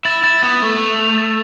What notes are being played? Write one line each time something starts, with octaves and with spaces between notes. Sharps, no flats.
E4 A6
E4 A6
B3 A6
A3 A6
F7
F7
A6